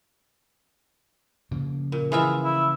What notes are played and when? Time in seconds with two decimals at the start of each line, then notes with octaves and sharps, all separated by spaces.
1.51 C#3 F3 A#3
1.92 A#2
2.12 E3 F4 G#4 E5
2.44 E4